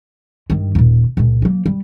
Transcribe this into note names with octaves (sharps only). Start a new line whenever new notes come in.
G2 D#3
D#1 A#2
C#2 A#2
F#3 A#3
G3